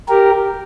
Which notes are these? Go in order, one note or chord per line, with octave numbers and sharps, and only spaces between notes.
G4 A#4